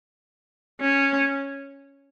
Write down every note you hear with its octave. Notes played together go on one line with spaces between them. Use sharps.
C#4